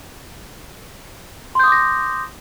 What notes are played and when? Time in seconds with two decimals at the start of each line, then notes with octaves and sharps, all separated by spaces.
1.55 C6
1.59 G6
1.64 D#6
1.68 D6
1.72 A#6